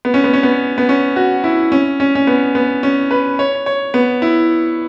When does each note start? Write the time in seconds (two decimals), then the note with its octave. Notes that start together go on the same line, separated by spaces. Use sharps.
0.05 B3
0.14 C#4
0.24 B3
0.34 C#4
0.43 B3
0.78 B3
0.89 C#4
1.16 F#4
1.44 E4
1.72 C#4
2.00 C#4
2.15 C#4
2.27 B3
2.55 B3
2.83 C#4
3.11 B4
3.39 C#5
3.66 C#5
3.94 B3
4.22 E4